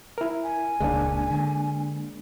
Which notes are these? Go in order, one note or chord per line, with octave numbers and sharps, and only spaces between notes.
E4 A#4
G#5
D#1 C#2 C#3 G#3 A#3 D4
D3